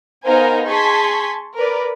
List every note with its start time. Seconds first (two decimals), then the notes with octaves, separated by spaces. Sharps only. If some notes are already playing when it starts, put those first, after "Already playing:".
0.25 B3 D#4 A#4 C5 F5 G#5
0.66 G#4 A5 C6 C#6 G#6 B6
1.55 A#4 B4 D5